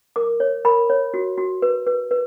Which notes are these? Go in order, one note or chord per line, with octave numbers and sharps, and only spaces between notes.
A#4 D6
C#5
A#4 B5
C#5
F#4
F#4
B4
B4
B4